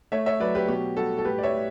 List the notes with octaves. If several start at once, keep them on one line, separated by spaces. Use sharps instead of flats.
A3 C#5 E5
C#5 E5
F#3 B4 D5
G4 B4
B2 G4
G3 F#4 A4
A4
A2 G4 B4
D5
C#5 E5
A2